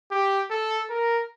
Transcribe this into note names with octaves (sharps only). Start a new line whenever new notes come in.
G4
A4
A#4